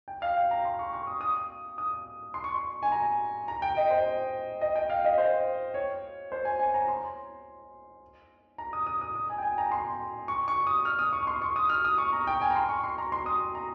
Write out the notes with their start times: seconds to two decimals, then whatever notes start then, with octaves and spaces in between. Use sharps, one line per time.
0.08 G5
0.22 F5
0.37 G5
0.51 A#5
0.65 C6
0.79 C#6
0.93 C#6
1.07 D#6
1.21 D#6
1.78 D#6
2.34 C6
2.44 C#6
2.55 C6
2.83 G#5
2.92 A#5
3.48 A#5
3.62 G5
3.77 D#5
3.91 C5
4.61 D#5
4.76 G5
4.90 F5
5.05 D#5
5.18 C5
5.74 C#5
6.32 C5
6.45 G#5
6.59 G#5
6.74 A#5
6.88 C6
8.58 A#5
8.73 D#6
8.87 D#6
9.01 D#6
9.15 D#6
9.30 G#5
9.38 G5
9.43 G#5
9.58 A#5
9.72 C6
10.28 C#6
10.48 C#6
10.67 D#6
10.85 F6
10.99 D#6
11.13 C#6
11.27 C6
11.42 C#6
11.56 D#6
11.69 F6
11.85 D#6
11.98 C#6
12.13 A#5
12.27 G5
12.41 G#5
12.50 A#5
12.56 C6
12.69 C#6
12.84 C6
12.98 A#5
13.12 C6
13.26 D#6
13.55 A#5